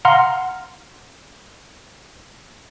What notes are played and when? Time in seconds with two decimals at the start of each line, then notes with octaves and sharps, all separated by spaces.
0.05 F5 F#5 A#5 C6 F6